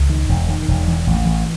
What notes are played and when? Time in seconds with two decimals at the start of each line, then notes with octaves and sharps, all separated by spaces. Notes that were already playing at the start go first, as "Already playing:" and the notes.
Already playing: C#2
0.09 D#3
0.29 E1
0.49 D#3
0.68 E1
0.88 E3
1.07 A1
1.26 E3